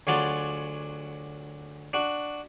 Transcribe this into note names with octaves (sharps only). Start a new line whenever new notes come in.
D2 F#3 G#3 F4 F#4 D5
D4 F#4